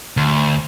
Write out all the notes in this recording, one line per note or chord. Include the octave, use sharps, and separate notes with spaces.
D2